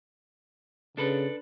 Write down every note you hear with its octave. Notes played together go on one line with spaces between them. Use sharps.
C#3 D4 A4 B4